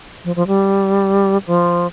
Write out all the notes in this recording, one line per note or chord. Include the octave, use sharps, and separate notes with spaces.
F3
F3
G3
F3